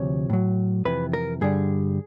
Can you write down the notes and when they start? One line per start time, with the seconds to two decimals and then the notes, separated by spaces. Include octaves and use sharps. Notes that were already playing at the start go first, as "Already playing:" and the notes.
Already playing: D2 C3 F3 C#5
0.30 A2 F#3
0.85 F2 C3 E3 B4
1.13 A#4
1.41 G2 D3 G3 G#4